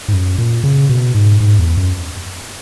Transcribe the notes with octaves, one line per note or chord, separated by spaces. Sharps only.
G#2
F#2
A#2
C#3
B2
G#2
G#2
E2
F#2